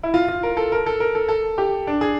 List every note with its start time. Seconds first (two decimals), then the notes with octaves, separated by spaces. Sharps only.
0.03 E4
0.14 F4
0.28 F4
0.43 A#4
0.57 A4
0.72 A#4
0.86 A4
1.00 A#4
1.15 A4
1.28 A4
1.58 G4
1.87 D4
2.01 G#4